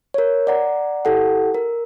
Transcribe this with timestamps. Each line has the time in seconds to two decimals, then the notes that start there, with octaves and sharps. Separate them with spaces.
0.14 A#4 C#5
0.47 D5 F#5 A#5
1.05 E4 G4 A4 F#5
1.54 A#4